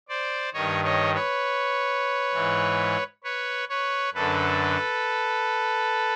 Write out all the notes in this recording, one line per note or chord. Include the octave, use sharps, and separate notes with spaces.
C5 D5
G2 D#3 C#5 D#5
C#5 D#5
B4 C#5
G#2 E3
B4 C#5
B4 C#5
F#2 D3 A4 B4